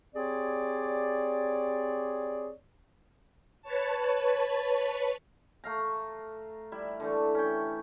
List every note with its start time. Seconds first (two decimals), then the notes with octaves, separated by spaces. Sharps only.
0.15 C4 G4 G#4 C#5 D5
3.62 B4 C#5 A5
5.64 A3 F5 A#5
6.72 G3 E4
7.00 D3 E3 A3
7.34 C#4 G5